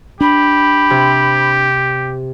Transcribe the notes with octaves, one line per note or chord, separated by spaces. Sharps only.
D4 G4 B5
C3